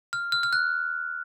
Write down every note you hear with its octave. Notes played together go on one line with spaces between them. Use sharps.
F6
F6
F6
F#6